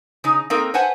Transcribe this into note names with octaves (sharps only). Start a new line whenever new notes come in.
C#3 D#4
A#3 C4 D#4 A4 A#4 G5
B4 C5 F#5 G#5 A5